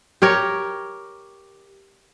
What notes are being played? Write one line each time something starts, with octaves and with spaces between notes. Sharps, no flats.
G4 A#4 C#5